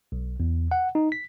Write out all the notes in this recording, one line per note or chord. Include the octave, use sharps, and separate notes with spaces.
B1
E2
F#5
D#4
B6